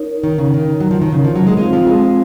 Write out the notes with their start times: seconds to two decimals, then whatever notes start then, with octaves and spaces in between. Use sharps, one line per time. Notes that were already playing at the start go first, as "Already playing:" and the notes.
Already playing: D#4 A#4 C#5
0.24 D#3
0.38 C#3
0.54 D#3
0.80 F#3
0.91 F3
1.02 D#3
1.12 C#3
1.24 F3
1.36 F#3
1.47 G#3
1.57 G#3 C4 F4 C5 F5
1.73 F3
1.87 G#3